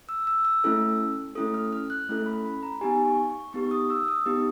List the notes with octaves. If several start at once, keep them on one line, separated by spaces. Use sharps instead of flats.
E6
E6
E6
A3 C#4 E4 A4
A3 C#4 E4 A4 D#6
F6
F6
F#6
A3 C#4 E4 A4
B5
B5
A#5
B3 D#4 G4 G#5
C#6
C#6
B3 D#4 G4 C#6
D#6
E6
D#6
B3 D#4 G4